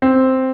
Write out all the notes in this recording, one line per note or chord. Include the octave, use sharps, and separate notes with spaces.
C4